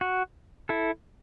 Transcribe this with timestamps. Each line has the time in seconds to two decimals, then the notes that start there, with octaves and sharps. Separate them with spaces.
0.01 F#4
0.69 E4 A4